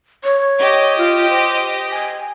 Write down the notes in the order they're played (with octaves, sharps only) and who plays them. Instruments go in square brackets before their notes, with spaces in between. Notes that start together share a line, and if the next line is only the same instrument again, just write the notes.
[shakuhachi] C#5
[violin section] G4 D#5
[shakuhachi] F4
C5
G#5